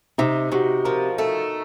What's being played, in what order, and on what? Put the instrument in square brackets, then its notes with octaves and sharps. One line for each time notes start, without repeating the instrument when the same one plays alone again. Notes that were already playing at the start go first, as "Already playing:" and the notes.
[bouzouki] C3 [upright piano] D#4
[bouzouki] C3 [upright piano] F#4
[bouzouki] F3 [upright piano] A#4
[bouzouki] A3 [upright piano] A4